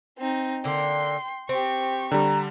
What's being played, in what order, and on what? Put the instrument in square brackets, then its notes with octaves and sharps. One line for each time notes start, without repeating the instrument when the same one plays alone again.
[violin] C4 D#4
[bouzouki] D3 A#3 [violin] G5 C6
[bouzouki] C4 [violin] G4 C#6
[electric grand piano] D3 G3 [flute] A#5